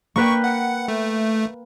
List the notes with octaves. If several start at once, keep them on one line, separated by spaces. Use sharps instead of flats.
A#3 B4 G5 C#6
F#5
A3